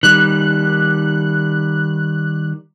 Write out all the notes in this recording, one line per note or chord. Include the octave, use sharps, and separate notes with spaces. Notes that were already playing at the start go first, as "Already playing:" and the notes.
D#3 G3 F#6